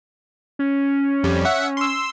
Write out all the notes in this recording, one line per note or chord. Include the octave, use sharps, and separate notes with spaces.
C#4
F2 G3
E5 F#5
C6 E6